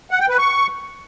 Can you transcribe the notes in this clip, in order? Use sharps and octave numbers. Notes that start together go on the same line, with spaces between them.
F#5
G5
B4
C#6